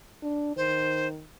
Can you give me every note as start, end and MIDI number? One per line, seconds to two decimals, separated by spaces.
0.23 0.55 62
0.57 1.23 51
0.57 1.08 72